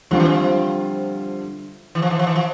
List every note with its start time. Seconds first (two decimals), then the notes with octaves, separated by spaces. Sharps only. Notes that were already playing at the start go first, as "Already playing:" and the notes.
0.11 D3 F3 G3 C4 F4
0.20 E3
0.29 F3
1.95 E3
2.02 F3
2.10 E3
2.19 F3
2.27 E3
2.35 F3